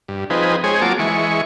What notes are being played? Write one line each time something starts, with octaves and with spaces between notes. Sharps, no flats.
G2
F3 C4 D#4 G#4 B4
G#3 C4 G#4 C#5
F#3 A#3 F4 A5 D6
E3 G#3 C#6